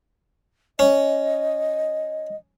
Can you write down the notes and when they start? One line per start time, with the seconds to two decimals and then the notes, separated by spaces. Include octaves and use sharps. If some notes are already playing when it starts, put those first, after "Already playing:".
0.79 C#4 D#5